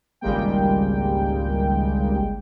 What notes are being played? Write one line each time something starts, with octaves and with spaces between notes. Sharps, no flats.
G#1 C#2 G3 G#3 A#3 G5